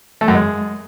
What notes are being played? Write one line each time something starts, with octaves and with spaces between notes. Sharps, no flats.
A3
F#2
G#3